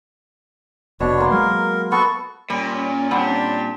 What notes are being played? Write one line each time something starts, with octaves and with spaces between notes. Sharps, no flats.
F1 B2 B3 D4 C#5
A#3 C6
F#3 G#3 A#4
B3 F#4 A4 C#6
A#2 G3 C#4
G3 C4 D4 G4 F#5